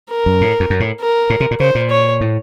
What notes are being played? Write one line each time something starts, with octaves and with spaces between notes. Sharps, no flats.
A#4
F#2
A2
F2
F#2
A2
A#4
A2
C3
A#2
C#3 C5
A#2
C#5
A2